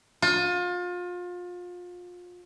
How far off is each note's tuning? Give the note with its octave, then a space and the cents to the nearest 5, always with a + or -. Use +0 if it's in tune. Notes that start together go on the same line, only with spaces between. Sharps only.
F4 +30